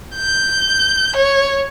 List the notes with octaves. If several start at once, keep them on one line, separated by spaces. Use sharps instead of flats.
G6
C#5